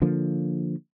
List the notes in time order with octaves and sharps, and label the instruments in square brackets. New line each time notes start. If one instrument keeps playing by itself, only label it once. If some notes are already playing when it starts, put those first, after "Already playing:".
[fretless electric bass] D3 F3 A#3